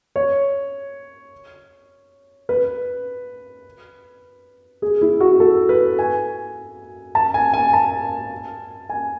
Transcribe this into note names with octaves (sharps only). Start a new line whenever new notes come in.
C#5
B4
G#4
E4
F#4
A4
B4
G#5
A5
G#5
G#5
A5
G#5